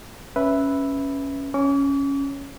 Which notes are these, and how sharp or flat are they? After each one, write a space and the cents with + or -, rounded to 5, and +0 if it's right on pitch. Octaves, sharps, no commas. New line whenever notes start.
C#4 +0 B4 +0 E5 +0
C#4 +0 D6 -45